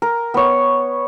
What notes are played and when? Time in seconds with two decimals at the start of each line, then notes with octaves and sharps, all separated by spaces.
0.02 A#4
0.34 B3 C#5